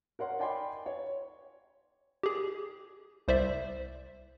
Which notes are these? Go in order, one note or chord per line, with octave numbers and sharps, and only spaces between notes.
A#4 C#5 F#5 C6
D5 D#5 G5 G#5 B5 C6
C#5
G4 G#4
C2 C5 D5 E5